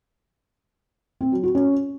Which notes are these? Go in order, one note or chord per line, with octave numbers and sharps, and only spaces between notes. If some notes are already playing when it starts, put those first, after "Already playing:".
C4
F#3
F#4
C#4